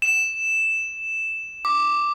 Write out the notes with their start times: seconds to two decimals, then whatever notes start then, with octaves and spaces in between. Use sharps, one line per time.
0.02 E7
1.65 D6